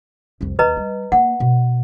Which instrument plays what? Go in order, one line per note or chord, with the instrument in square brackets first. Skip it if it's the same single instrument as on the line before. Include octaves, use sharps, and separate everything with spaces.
[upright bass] C2 F2
[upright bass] D#2 [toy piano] B4 D#5 A#5
[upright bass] G3
[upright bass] A#3 [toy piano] F#5
[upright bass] B2